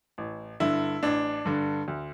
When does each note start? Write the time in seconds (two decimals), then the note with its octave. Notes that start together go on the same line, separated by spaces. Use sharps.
0.18 A1
0.60 G2 D3 E4
1.03 A1 D4
1.45 G2 D3
1.88 D2